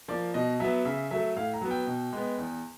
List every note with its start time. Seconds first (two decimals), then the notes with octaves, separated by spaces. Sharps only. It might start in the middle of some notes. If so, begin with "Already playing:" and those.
0.08 F3 A#3 D5
0.34 B2 D#5
0.60 F#3 B3 E5
0.85 C#3 E5
1.11 F#3 A3 E5
1.36 A2 F5
1.54 A#5
1.61 F#3 B3
1.71 G5
1.87 B2
2.13 G#3 B3
2.38 E2